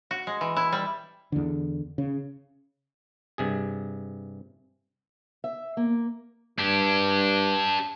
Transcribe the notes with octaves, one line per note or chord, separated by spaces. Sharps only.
F#4
G#3
E3
E4
G3
E2 D3
C#3
G2 C3 G#4
E5
A#3
G2 D4 G4